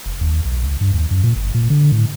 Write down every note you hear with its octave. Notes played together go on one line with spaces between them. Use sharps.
F1
D#2
B1
C#2
G2
D#2
F#2
A#2
G1
A#2
D3
A2